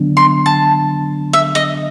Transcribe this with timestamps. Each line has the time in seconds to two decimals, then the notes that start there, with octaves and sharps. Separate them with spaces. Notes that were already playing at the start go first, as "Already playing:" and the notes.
Already playing: D3 F#3 B3 D4
0.17 C6
0.46 A5
1.33 E5
1.55 D#5